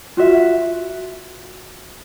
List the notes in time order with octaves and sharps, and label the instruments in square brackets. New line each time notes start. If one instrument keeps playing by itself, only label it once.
[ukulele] F4 F#4 E5